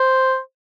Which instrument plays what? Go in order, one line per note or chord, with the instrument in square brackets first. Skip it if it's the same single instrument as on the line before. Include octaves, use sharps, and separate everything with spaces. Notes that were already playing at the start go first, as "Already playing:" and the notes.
Already playing: [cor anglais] C5